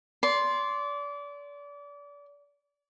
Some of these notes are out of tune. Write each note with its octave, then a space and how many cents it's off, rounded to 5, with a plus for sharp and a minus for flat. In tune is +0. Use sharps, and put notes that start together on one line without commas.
D5 -30 C6 +0